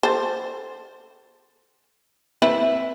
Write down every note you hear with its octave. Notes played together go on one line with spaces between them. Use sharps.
A4 C5
C4 E4 B4 E5